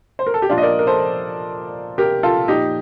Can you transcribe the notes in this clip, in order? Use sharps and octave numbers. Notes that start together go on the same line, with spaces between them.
C5
A#4
A4
G4
A#2 F3 D4 F4
D#5
A#4 D5
A#4
A4 C5
G4 A#4
F4 A4
A#2 F3 D#4 G4